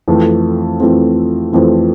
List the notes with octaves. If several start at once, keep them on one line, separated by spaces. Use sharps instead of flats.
F2 E3 A3 C4
F2 E3 A3 C4
F2 E3 A3 C4